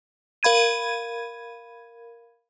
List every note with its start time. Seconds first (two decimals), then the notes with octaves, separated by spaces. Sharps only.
0.43 A#4 F5 B5 G#6 D#7